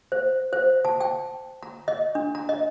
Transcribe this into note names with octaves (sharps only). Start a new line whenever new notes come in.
C5
C5
A5
G5
A#5
D#5
D4
A#5
D#5